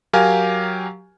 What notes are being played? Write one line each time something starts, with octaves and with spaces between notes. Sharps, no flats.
F#3 G4 A#4 F5 G#5